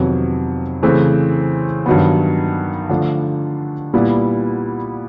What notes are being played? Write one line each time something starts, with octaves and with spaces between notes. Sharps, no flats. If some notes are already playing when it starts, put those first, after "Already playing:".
Already playing: F2 C3 D#3 F#3 B3
C#3 E3 A3 C4
G2 D#3 F#3 B3
D3 F3 A3 D4 F4
A#2 G3 B3 E4